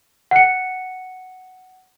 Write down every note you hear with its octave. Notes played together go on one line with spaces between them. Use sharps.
F#5 C#7